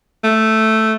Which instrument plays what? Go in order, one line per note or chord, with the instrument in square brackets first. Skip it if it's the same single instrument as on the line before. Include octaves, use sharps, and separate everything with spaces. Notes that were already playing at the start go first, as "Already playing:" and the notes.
[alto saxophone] A3